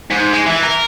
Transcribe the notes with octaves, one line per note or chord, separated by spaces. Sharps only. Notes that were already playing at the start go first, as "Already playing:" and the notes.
G#2
G#3
E3
A#4